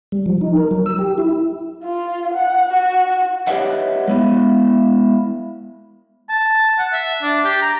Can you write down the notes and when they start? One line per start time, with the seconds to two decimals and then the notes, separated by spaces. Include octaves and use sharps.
0.12 G3
0.26 F3
0.41 D#4
0.57 A#4
0.71 F#3
0.86 E6
0.99 G4
1.18 E4
1.84 F4
2.34 F#5
2.73 F#4
3.47 G4 B4 C#5 D#5 E5 F#5
4.08 G#3 B3 E4
6.29 A5
6.78 F#5
6.93 E5
7.23 D4
7.45 G4
7.62 A#5